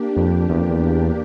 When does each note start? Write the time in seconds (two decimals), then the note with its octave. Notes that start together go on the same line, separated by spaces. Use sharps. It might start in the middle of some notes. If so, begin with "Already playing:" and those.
Already playing: A#3 D4 G4
0.17 F2
0.50 E2
0.60 F2
0.69 E2